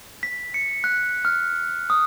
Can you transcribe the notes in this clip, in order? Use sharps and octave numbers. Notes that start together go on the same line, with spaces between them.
B6
C#7
F#6
F6
D#6